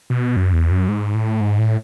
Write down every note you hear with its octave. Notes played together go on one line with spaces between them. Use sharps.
B2
F#2
E2
F#2
G#2
A2
G#2
A2